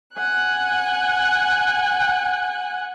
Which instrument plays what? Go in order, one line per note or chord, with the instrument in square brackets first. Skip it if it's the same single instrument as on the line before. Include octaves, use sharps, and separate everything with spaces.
[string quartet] F#5 G#5 F#6